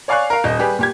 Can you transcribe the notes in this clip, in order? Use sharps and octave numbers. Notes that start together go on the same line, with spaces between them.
C#5 D5 F5 G#5 C#6 F#6
A#4 F5
D#1 D#5
G3 G4 G#4 B4
A#2 G4 G#6